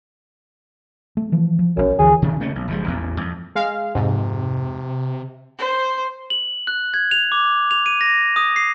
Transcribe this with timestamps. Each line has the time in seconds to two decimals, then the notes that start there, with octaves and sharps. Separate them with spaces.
1.17 A3
1.32 E3 F3
1.59 F3
1.77 A#1 F#2 C#3 C#4
1.99 D2 E3 G#4
2.22 C3 D#3
2.40 C#3 A3 A#3 C#4
2.56 B1
2.68 F#1 G2 F3 G#3
2.86 A1 E2 A#2
3.21 F2
3.55 G#3 F5
3.95 F2 G#2 C3
5.58 C5
6.30 F#7
6.67 F#6
6.94 G#6
7.11 F7
7.32 D6
7.71 F7
7.86 D#7
8.01 A#6
8.36 D#6
8.56 C7